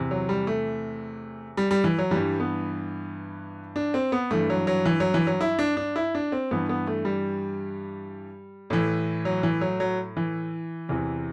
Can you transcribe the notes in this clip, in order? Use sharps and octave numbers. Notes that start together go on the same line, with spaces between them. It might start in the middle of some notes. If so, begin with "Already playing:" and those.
Already playing: E2 C3 E3
F#3
G3
A3
G3
G3
E3
F#3
E3 G3
G2
B3
D4
C4
B3
G2 E3 A3
F#3
F#3
E3
F#3
E3
F#3
E4
D4
D4
E4
D4
C4
G2 E3 B3
B3
A3
G3
A2 E3
F#3
E3
F#3
F#3
E3
E2 C3 E3